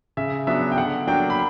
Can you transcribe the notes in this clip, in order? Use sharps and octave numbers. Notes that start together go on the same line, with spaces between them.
C#3 E5
F#3 B3 D4 E5
G5
D3 F#5
F#3 A#3 D4 G5
B5